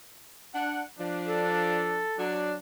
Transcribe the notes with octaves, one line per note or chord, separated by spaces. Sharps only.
D4 F#5
F3 D4
A4
F#3 D4